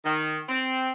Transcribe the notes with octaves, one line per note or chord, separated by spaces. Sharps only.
D#3
C4